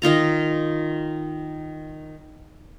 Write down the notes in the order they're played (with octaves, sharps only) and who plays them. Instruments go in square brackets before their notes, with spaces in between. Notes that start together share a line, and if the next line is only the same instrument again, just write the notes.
[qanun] D#3 D#4 F4 A#5